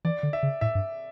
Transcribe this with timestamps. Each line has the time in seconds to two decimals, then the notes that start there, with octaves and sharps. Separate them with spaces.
0.05 E3 D5
0.23 D3
0.33 E5
0.43 C#3
0.61 A2 E5
0.75 G2